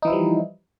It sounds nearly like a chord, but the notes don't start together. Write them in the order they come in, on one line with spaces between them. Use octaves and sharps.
D#4 E3 E4 F3 G3